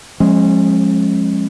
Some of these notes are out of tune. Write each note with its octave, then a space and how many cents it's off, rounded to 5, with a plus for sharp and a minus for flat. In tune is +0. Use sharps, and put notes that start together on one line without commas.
F3 +25 G#3 +0 C#4 -30